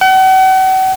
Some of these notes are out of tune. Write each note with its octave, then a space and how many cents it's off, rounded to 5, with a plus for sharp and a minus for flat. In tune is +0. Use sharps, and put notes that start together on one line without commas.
F#5 +40